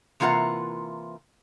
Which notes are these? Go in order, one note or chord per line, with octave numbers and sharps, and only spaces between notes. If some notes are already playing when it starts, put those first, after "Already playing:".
C3 E3 A#3 F4 F#5 A#5